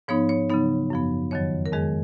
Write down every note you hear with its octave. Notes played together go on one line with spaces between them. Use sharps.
G#2 F3 B3 D#4 C#5
C#5
C#3 F#3 B3 D#4
F#2 F3 B3
F2 D#3 F#3 C#5
A#4
F2 D#3 G#3 G#4